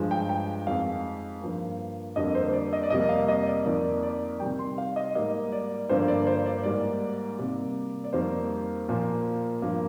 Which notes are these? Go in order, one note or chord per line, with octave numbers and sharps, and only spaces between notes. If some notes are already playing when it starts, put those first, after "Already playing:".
Already playing: G2 F3 G#3
G5
G5
F2 D#3 G#3 F5
G2 F3 A#3
F2 D3 G3 A#3 D#5
C5
C5
D5
D#5
D5
F2 C3 G3 A#3 D#5
F5
D#5
D5
F2 D#3 A#3 D5
D5
D5
C3 D#3 G3 G5
C6
F5
D#5
G#2 G3 A#3 D#5
D5
G2 D3 F3 A#3 C5
D5
C5
D5
G#2 G3 A#3 D5
C3 G3 A#3
D5
F2 D#3 G3 A#3 C5
A#2 F3 A#3
G2 F3 A#3